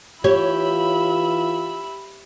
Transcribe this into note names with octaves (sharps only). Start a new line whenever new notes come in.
E3 F4 G4 C#5 E5 B5